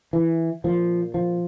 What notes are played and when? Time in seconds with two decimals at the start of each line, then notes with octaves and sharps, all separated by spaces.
0.13 E3
0.64 A#2 F3
1.14 F3